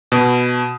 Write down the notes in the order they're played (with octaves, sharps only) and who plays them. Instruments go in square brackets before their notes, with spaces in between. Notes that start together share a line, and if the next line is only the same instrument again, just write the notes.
[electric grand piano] B2